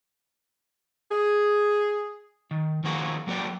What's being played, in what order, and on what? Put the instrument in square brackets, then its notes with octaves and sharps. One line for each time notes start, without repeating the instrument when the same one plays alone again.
[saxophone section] G#4
[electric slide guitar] D#3
D#3 F3 A#3 F#4 G#4 A#4
F#3 A#3 F#4 D5 G5